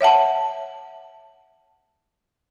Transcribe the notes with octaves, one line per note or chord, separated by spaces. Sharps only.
C#5 E5 F#5 A5